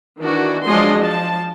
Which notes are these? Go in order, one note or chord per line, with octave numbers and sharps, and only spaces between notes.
D#3 E3 D4 F#4
F3 F#3 G#3 D4 D#5 C6
F3 A5